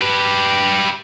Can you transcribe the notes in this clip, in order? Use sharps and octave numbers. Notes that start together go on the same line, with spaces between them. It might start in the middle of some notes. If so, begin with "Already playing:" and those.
G4 B4